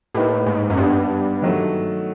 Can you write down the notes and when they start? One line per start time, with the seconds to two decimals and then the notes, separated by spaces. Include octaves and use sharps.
0.15 A2 A#3 D#4 G4 B4
0.46 G#2
0.70 F#2
0.77 G2 G3 B3 D4
1.42 D#3 F#3 A3